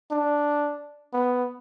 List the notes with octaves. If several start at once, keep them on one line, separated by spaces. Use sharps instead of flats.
D4
B3